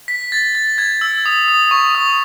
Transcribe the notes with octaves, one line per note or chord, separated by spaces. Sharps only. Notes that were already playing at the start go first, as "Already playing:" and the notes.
B6
A6
A6
G#6
E6
D#6
D#6
C#6
D#6